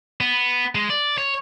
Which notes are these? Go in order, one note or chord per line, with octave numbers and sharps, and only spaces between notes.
B3
G#3
D5
C#5